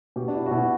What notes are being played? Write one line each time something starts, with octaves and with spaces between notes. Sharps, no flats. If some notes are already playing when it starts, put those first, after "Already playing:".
B2 G4
D4
E4
F#4
B2 E4